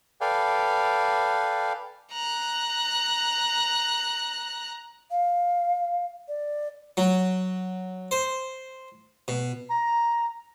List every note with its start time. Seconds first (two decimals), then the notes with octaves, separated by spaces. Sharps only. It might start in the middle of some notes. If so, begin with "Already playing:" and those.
0.21 A4 B4 D5 F5 G5 G#5
2.12 A#5 F#6
5.11 F5
6.28 D5
6.97 F#3
8.11 C5
9.28 B2
9.69 A#5